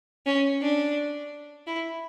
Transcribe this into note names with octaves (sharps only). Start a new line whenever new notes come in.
C#4
D4
E4